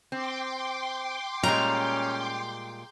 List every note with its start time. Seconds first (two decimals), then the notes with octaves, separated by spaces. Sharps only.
0.12 C4 G5 C6 D6
1.43 A#2 G3 G#3 C#4 A#5